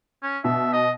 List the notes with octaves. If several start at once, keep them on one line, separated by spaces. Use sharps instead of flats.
C#4
B2 E5
D#5